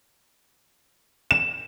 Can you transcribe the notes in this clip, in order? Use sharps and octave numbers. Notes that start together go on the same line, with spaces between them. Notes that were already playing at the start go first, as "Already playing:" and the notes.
E7